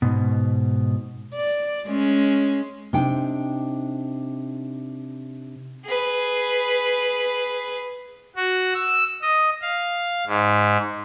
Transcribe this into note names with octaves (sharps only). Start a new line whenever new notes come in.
G#2 B2
D5
G#3 C#4
C3 D4 D#4 G5
G#4 B4
F#4
E6
D#5
F5
G#2